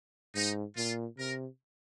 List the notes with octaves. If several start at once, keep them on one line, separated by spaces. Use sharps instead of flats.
G#2 D#4
A#2 F4
C3 A#4